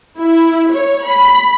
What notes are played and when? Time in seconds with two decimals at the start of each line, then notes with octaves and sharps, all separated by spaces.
0.19 E4
0.74 C#5
1.07 B5